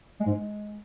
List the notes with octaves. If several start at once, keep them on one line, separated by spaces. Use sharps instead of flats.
G#3
G#2
G#3